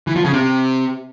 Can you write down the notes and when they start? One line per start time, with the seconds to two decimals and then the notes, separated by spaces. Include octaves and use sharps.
0.07 E3
0.16 F3
0.25 C#3
0.33 C3